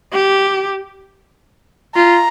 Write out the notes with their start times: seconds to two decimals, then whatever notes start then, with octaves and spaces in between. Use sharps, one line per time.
0.12 G4
1.95 F4 A#5